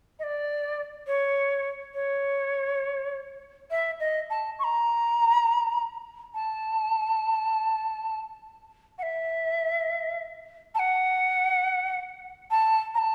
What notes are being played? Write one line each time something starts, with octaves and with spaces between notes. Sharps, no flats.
D#5
D5
C#5
C#5
E5
D#5
A5
C#6
A#5
A5
F#5
E5
A5
F#5
A5
A#5
A5